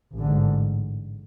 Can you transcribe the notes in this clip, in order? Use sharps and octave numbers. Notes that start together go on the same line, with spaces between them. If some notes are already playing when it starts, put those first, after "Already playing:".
A1 G#2 D3